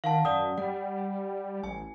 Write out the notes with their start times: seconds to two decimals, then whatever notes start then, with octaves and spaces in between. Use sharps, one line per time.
0.04 D#3 F5 F#5 A5
0.25 F#2 D5 F#5 D#6
0.58 G3 F#5
1.64 A1 G#5